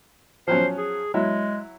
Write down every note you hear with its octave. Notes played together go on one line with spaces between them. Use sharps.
F3 F#3 C#4 C5
G#4
F#3 G#3 E4